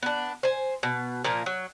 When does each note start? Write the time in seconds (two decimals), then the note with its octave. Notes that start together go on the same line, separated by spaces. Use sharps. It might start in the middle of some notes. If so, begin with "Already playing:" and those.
0.03 B3 D4
0.43 C5 G#5
0.83 B2
1.24 A#2 F3 A#3
1.46 F#3